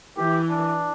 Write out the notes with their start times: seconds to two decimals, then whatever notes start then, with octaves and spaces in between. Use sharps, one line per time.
0.17 E3 G4
0.50 D4